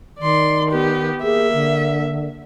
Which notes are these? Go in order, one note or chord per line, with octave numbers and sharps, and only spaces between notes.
D#3 D5 C6
B3 G4
A#3 G#4 E5
D3